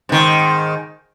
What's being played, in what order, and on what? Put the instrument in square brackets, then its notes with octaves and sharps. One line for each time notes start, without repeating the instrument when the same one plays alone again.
[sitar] G#2 D#3